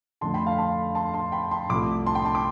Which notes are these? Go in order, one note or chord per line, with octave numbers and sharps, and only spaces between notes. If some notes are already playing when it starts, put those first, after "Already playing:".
F2 D3 A3 A5 C6
G5 B5
F5 A5
A5 C6
A5 C6
A5 C6
G5 B5
A5 C6
C2 C3 F3 A3 B5 D6
A5 C6
G5 B5
A5 C6
B5 D6